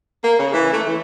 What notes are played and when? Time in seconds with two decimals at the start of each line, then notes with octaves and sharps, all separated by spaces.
0.24 A#3
0.39 C#3
0.54 E3
0.72 A3
0.87 E3